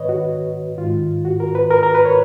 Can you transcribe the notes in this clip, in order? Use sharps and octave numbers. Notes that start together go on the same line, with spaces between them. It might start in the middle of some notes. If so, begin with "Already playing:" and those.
Already playing: G#2 D#3 B4 C#5 D#5
F#4
G#2 D#3 F4
F#4
A#4
B4
A#4
A#4
B4
C#5